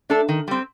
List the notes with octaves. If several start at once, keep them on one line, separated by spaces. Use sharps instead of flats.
A3 D4 A4
D#3
G3 C4